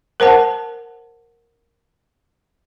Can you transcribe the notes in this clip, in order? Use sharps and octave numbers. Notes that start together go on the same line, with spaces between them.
A#4 C5 F#5 A5